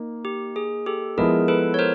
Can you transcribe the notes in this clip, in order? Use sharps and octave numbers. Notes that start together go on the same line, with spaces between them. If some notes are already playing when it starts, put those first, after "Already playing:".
Already playing: A#3 D#4
G4
G#4
G4 A4
F3 G#3 B3 E4 G#4 A#4
A4 B4
C#5
A#4 C5